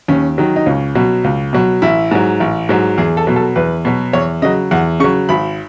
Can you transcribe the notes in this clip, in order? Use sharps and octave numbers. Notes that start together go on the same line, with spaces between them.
D#2 C#4
D#3 F#3
D#4
C#2 C#4
B2 F#3
C#2
B2 F#3
A1 E4
G#2 F#3
A1
G#2 F#3
E2 G#4
A4
B2 F#3
A4
E2 B4
B2 F#3
E2 C#5
C#3 F#3 D#5
E2 F#5
C#3 F#3 C#6
G#1 B5